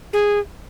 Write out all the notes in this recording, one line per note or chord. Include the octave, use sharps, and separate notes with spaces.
G#4